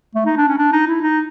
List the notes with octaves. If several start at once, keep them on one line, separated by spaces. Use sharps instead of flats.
A3
D#4
D4
C#4
D4
D#4
E4
D#4